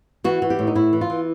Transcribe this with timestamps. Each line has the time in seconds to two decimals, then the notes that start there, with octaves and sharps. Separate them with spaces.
0.24 E3 F#4
0.42 E3
0.50 G4
0.59 A2
0.67 D#4
0.75 A2 E4
0.93 E3
1.01 F4
1.10 E3